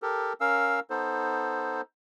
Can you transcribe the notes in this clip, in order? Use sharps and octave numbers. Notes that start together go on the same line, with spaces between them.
G4 A4 A#4
C#4 A#4 F5 E6
B3 D#4 A4 C5